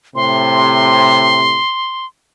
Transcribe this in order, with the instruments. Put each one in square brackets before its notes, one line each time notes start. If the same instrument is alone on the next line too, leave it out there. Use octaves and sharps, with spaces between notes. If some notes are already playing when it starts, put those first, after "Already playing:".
[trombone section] A2 C3 [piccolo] C6